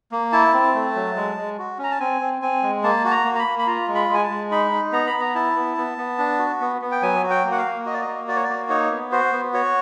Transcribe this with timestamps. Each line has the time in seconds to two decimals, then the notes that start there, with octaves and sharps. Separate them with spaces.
0.12 A#3
0.32 E4 A5
0.53 C4
0.75 A3
0.95 F#3
1.16 G#3
1.37 G#3
1.58 F#4
1.79 C#4
1.84 A#5
1.91 A5
2.00 C4 G#5
2.21 C4
2.42 C4 G#5
2.63 G#3
2.84 A#3 A5
3.05 F#4 A5
3.11 A#5
3.25 A#3
3.35 A#5
3.39 B5
3.46 A#3
3.59 B5
3.67 F4 A#5
3.88 G#3
3.95 B5
4.09 G#3
4.14 G#5
4.23 A5
4.30 G#3
4.51 D#4 B5
4.71 D#4
4.92 B3 A#5
5.07 B5
5.14 B3
5.21 A#5
5.35 E4 A5
5.56 B3
5.77 B3
5.98 B3
6.19 D4
6.39 F#4
6.61 B3
6.82 B3
6.91 G5
7.02 F#3 G#5
7.23 F#4
7.30 G5
7.45 A#3
7.52 F#5
7.58 F5
7.65 A#3
7.86 F#4 D#5
7.94 D5
8.01 D#5
8.07 A#3
8.28 F#4 D5
8.36 C#5
8.44 D5
8.49 A#3
8.69 D#4 C#5
8.91 B3
9.12 F#4 C5
9.32 B3
9.53 F#4 C#5